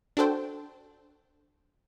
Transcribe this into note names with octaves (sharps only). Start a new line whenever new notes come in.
D4 F#4 A4 C5 G5